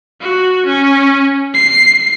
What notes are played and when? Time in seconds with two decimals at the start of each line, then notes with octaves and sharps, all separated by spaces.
0.21 F#4
0.66 C#4
1.54 C7